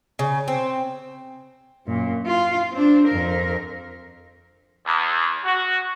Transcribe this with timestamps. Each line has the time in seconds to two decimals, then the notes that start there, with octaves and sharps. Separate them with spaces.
0.19 C#3
0.48 C4
1.86 F#2 A#2
2.26 F4
2.72 C4 D4
3.07 F2 A#4
4.86 E2
5.45 F#4